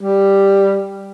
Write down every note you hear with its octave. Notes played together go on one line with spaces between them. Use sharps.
G3